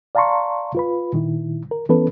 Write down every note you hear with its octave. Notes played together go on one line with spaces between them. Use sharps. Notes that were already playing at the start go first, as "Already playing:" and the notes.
D5 F5 A5 A#5 C6 C#6
F4 B4 B5
A#2 D#3 E4
A#4
E3 B3 C#4 A4 B4